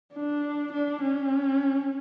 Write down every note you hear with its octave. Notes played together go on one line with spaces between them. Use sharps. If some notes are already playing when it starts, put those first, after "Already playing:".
D4
D4
C#4